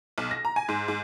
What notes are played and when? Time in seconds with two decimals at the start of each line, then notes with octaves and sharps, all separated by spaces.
0.18 B1
0.31 A#6
0.45 A#5
0.56 G#5
0.69 G#2
0.88 G#2